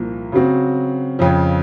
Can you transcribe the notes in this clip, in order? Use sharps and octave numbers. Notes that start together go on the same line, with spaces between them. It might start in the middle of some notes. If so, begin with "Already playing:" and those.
Already playing: C2 A#2 F3 A#3
C#3 F#3 C4 F#4
F2 C#3 F3